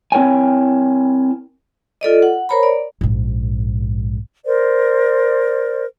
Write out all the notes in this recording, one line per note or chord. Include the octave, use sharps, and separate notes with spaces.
C4 E4 A#4 C#5 G5 G#5
F4 A4 D5 D#5
F#5
A#4 C5 C#5 A#5 B5
D5
A#1 G#2
A#4 C5 D5